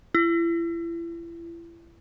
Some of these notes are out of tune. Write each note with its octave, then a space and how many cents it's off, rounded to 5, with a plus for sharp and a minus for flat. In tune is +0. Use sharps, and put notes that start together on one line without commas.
E4 +35